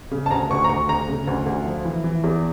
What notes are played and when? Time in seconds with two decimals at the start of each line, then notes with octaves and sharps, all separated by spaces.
0.11 C#3
0.26 A5
0.31 D2 A#5
0.50 D2 C#6
0.64 A#5
0.69 D2 C#6
0.89 D2 A#5
1.08 C#3
1.27 D2
1.46 D2
1.66 F3
1.85 E3
2.04 E3
2.24 E2